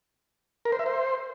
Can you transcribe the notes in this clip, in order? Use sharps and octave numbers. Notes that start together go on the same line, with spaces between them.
A#4
C5
E5
C5